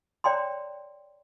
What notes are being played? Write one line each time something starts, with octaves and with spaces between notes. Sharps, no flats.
C#5 D5 G5 A#5 C6